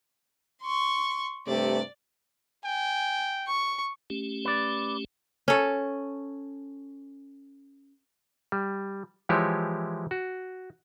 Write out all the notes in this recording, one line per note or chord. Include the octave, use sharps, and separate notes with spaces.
C6 C#6
G2 C3 A3 D5
G5 G#5
C#6
A3 C#4 G4
B4 D5
C#4 A4
G3
E3 F3 G#3 E4 G4 C#5
F#4